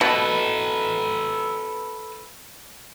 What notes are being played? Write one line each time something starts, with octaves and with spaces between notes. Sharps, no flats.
B2 A4 B4